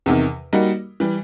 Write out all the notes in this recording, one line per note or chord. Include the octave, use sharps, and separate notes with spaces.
E2 C3 D#3
G3 A#3 D#4 F#4
E3 G3